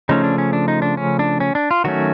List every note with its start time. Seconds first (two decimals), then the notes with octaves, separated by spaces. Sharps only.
0.09 C#3 F3 A3 C#4 D#4
0.24 D4
0.38 C#4
0.53 D4
0.68 D#4
0.82 D4
0.97 C#4
1.19 D4
1.40 C#4
1.55 D4
1.71 F4
1.84 D#3 F#3 A3 C#4 F#4